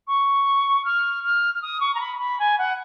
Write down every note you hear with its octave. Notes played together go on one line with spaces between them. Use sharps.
C#6
F6
F6
F6
D#6
C#6
A#5
B5
B5
G#5
F#5